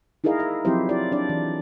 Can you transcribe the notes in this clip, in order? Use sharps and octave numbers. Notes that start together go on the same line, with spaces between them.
D#4 E4 G#4 A#4 D#5 F5
E5
F3 F#3 C4 E4 G4 C5
E4 G4 D5
D4 D5
E3